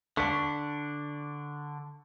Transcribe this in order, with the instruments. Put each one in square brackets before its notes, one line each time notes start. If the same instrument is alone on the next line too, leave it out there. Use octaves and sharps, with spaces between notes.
[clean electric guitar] D3 D4 [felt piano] C#6 B6